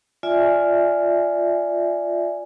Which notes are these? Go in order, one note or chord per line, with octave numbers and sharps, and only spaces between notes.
F4 D5 E5 G#5